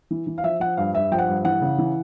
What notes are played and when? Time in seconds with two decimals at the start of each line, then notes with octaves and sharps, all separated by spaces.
0.11 E3
0.27 E3
0.38 F5
0.43 F3 E5
0.60 F3 F#5
0.77 G2 F5
0.94 G2 E5
1.11 F3 G5
1.18 F#5
1.28 G2
1.44 E3 F#5
1.62 C#3
1.78 E3